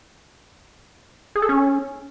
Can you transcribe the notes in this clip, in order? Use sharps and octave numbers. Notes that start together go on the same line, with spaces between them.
G#4
A4
C#4